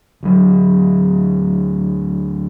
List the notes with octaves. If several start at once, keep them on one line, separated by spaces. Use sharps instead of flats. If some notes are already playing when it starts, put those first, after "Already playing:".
D2 F#3